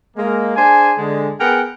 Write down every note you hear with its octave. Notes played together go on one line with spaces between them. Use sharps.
G#3 A#3
D4 G#4 C5 G#5
D3 G#3
B3 G#4 A#4 F#5 G5